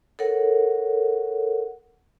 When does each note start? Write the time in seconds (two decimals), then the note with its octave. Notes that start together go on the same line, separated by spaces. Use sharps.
0.19 A4 A#4 C#5 F#5